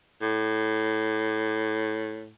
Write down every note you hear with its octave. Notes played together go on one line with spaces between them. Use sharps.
A2